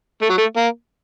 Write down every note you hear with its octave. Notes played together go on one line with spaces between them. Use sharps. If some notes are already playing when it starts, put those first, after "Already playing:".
A3
F#3
A3
A#3